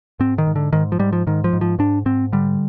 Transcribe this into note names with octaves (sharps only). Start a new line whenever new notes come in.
G#2 C4
D#3
G#2
D3
G#2 D#3
F3
G#2 G3
F3
G#2 D#3
F3
G#2
F3
G#2 D4
G#2 C4
D3 G3